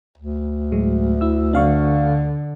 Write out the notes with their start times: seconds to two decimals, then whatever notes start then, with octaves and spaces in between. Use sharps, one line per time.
0.18 D2
0.72 A2 F#3 G#3
1.21 E4 E6
1.53 D3 D4 F5 C#6